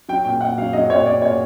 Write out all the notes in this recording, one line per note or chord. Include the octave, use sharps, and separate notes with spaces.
F#3 G5
A#2 G5
A#2 F#5
F#3 F5
F#3 D#5
A#2 C#5
C#5
B3 D5
A#2 C#5